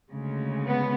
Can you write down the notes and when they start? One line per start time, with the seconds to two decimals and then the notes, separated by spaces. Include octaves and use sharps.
0.11 D2 C#3 G#3
0.64 B3